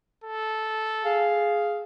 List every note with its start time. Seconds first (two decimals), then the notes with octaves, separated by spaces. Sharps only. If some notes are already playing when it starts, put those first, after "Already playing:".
0.24 A4
1.04 G#4 F5